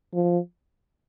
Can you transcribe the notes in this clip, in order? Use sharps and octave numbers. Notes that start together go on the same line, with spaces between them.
F3